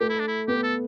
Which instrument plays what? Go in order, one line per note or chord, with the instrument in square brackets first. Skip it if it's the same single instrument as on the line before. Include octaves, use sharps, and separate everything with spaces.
[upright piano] A3 [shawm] G4
[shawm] E4
D4
E4
[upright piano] B3 [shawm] G4
[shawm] A4